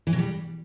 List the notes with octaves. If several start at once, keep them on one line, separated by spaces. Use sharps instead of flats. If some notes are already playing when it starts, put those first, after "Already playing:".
E3
B2
G3